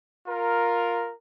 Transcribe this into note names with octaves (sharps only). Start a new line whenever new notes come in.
F4 A#4